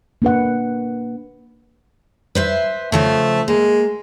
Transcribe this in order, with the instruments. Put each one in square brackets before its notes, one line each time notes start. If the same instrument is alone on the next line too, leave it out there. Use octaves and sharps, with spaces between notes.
[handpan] A#3 D4 B4 F#5
[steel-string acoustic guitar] B4 C5 E5
[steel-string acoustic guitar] C#3 F3 C5 [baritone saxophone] A3
[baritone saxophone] G#3 [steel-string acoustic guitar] A#3